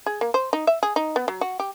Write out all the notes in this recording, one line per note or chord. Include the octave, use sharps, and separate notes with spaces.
G#4
A#3
C5
D#4
E5
G#4
D#4
B3
F#3
F#4
G4